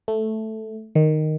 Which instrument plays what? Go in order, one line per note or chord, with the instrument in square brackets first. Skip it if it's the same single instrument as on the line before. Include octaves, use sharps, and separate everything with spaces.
[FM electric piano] A3
D#3